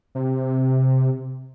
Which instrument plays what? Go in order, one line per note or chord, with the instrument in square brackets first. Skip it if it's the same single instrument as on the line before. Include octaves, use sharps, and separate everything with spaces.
[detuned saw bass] C3